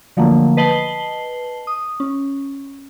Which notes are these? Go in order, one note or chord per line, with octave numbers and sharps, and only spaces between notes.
D3 F3 F#3 A3 A#3
B4 D#5 A5 C7 F#7 G7
D#6
C#4